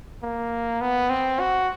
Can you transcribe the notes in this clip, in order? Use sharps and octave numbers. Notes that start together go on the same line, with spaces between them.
A#3
B3
C4
F#4